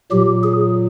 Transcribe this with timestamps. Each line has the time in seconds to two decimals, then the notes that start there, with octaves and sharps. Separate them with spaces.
0.11 A#2 F#3 G4
0.44 G#4